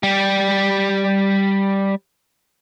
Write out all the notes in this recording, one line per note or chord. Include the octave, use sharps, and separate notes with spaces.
G3 G4